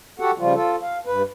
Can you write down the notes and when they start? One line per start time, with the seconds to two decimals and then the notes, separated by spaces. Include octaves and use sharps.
0.20 F#4 G4 A4 F#5
0.38 C#3 F3 G3 F4
0.54 F4 A4
0.82 F5
1.06 G2 B4